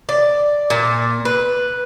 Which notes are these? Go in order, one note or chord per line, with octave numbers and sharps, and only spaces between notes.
D5
A#2
B4